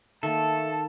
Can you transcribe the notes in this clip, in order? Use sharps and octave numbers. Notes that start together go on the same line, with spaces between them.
D#3 A3 A#3 A4 A5